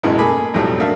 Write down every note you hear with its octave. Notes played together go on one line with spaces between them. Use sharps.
A1 F#2 B2 E3 G#3
A3 A#3 G#4 G#5 B5 D6
B1 F2 A2 F#3 G3 A3
A3 A#3 D4 F#4 E5 F5